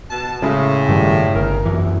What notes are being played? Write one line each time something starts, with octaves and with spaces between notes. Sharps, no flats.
B2 A5
A2 C#3 G#3
G2 D#3 G3
G1 A#4
F#2 E3